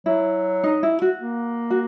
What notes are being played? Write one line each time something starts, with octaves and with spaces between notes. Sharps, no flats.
F#3 E4
D#4
E4
F#4
A#3
F#4